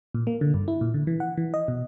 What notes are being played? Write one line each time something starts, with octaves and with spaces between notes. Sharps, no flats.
A#2
A#3
D3
G2
E4
A#2
D3
E3
F#5
E3
D#5
B2